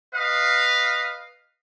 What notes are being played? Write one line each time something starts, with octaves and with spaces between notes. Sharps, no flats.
B4 D#5 F5